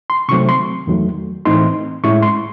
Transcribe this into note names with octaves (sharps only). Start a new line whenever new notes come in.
C6
C3 D#3 F#3 A3 C4 C#6
C6
E2 D#3 F#3 A3
A2 E3 A3 C4 D#4 C6
A2 G#3 C#4 E4 C#6
C6